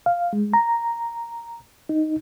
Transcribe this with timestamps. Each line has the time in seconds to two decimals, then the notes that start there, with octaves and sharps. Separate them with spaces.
0.06 F5
0.33 G#3
0.54 A#5
1.89 D#4